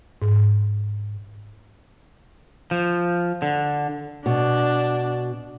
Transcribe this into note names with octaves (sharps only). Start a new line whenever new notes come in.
G#2
F3
D3
B2 D4